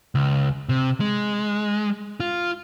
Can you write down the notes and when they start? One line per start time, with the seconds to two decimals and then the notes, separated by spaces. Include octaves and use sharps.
0.15 C#2
0.69 C3
1.00 G#3
2.20 F4